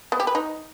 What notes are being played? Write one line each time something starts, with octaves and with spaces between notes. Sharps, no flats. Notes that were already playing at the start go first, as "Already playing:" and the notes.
B3
G4
B4
D#4